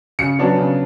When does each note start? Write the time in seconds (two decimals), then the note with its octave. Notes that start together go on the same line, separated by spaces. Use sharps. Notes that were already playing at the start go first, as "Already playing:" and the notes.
0.19 C#3 C#7
0.39 F#3 B3 D4
0.58 C#3